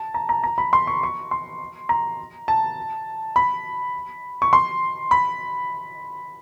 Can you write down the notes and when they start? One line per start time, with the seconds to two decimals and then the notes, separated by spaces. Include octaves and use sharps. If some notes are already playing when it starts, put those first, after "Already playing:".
Already playing: A5
0.14 A#5
0.29 A#5
0.44 A#5
0.58 B5
0.73 C6
0.87 C#6
1.03 C#6
1.31 C6
1.89 A#5
2.48 A5
3.36 B5
4.42 C#6
4.53 C6
5.11 B5